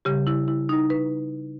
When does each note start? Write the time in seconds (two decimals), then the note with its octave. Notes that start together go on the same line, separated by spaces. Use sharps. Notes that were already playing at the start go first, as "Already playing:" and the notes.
0.05 C#3 G3 G4
0.27 E4
0.48 E4
0.69 D#4
0.90 B4